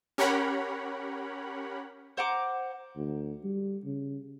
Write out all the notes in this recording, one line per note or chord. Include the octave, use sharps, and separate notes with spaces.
C#4 G4 A#4 C#5 F#5 B5
C5 F#5 A#5 D6
D2
G3
C#3